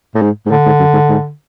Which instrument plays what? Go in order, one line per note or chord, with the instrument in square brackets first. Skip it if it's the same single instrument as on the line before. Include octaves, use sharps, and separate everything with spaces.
[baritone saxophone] A2
G#2
G#2
[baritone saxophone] A2 [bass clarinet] D3
[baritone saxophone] G#2
F#2
G#2
G#2